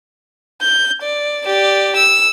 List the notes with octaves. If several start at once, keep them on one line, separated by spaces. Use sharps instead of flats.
G6
D5
G4 D5
E6